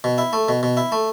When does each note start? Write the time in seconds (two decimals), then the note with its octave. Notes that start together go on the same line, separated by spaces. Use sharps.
0.04 B2
0.18 E4
0.33 A3
0.48 B2
0.63 B2
0.77 E4
0.92 A3